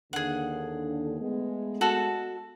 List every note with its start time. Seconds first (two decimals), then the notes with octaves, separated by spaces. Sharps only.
0.13 D#2 D3 G#4 F#5
1.20 G#3 A3 B3
1.81 F#4 A4 A5